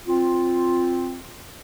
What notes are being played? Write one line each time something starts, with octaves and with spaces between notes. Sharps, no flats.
C4 F4